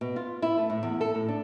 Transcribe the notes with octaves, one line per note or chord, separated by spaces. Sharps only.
B2
F4
E4
A3
A2
E2
A4
A2
D4